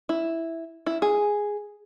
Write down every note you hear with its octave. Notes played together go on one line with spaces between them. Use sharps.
E4
E4
G#4